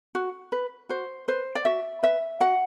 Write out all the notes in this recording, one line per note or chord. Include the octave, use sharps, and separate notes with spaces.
F#4
B4
F#4 C5
B4 C5
D5
F#4 E5
B4 E5
F#4 F#5